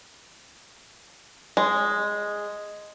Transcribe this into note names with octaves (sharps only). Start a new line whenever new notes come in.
G#3